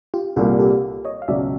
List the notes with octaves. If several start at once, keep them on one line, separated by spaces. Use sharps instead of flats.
F4 G4
C2 A#2 G3 A#3 F#4 G#4
G4 A4
C#5 D#5
F5
C#2 B2 F#3 D5 E5